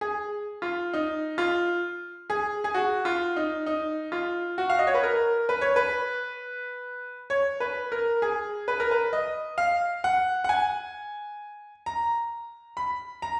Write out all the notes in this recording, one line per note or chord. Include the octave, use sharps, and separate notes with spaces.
G#4
F4
D#4
F4
G#4
G#4
F#4
F4
D#4
D#4
F4
F#4
F5
D#5
C#5
B4
A#4
B4
C#5
B4
C#5
B4
A#4
G#4
B4
A#4
B4
D#5
F5
F#5
F#5
G#5
A#5
B5
A#5